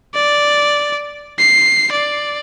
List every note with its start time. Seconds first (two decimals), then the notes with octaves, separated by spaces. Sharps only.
0.15 D5
1.39 C7
1.92 D5